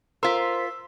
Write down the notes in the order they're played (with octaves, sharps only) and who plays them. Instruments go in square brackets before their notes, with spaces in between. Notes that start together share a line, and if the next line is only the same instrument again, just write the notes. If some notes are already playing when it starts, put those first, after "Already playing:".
[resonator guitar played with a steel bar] F4 A#4 [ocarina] C5 [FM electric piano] C6 B6 [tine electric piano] E6